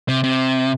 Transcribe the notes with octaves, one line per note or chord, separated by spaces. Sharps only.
C3
C3